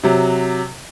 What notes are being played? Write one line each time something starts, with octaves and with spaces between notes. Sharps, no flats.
C3 F#3